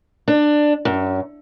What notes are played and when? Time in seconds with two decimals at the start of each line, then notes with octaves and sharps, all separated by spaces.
0.28 D4
0.85 F#2